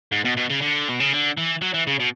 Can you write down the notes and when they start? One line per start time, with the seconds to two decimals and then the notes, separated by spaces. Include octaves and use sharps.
0.12 G#2
0.25 B2
0.37 B2
0.50 C#3
0.62 D3
0.89 B2
1.00 C#3
1.13 D3
1.37 E3
1.62 F#3
1.74 E3
1.87 C#3
2.00 B2